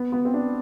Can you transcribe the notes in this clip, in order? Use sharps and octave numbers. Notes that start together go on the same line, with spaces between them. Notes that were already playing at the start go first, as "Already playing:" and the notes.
Already playing: B3
B3
C4
D4